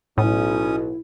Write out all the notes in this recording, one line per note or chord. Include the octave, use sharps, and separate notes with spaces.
B1 A2 C#4 E4 D#6